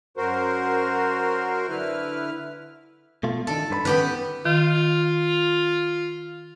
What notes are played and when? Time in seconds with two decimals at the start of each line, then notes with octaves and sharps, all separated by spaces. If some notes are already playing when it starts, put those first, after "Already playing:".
0.17 F#2 F#4 A#4 C5
1.69 D3 E4 B4 F6
3.23 B2 A3 F4
3.47 D3 D#3 A4
3.70 G2 B4 B5
3.85 D#3 B3 C#4 G4 B4
4.45 D#3 F4